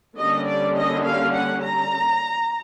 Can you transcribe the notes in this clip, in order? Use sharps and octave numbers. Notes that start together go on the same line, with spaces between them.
D3 G3 A#3 C#4 D#5
D5
D#5
F5
F#5
A#5